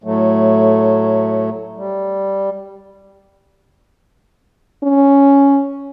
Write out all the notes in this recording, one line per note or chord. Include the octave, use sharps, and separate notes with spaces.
A2 F#3 A3
G3
C#4